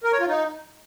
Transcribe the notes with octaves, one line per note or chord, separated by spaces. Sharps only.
A#4
C#5
F4
D#4